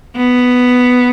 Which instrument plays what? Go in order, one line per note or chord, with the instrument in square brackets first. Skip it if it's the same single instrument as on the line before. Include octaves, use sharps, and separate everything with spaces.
[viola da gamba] B3